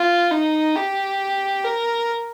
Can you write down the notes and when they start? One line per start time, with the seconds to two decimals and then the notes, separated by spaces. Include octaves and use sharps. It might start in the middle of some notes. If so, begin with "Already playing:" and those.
Already playing: F4
0.31 D#4
0.76 G4
1.65 A#4